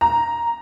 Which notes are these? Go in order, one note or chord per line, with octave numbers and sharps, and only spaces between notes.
A#5